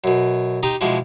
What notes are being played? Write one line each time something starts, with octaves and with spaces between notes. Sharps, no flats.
F#2 B2
D#4 G4 D#5 A#5 C6
B2 E3 F3 G#3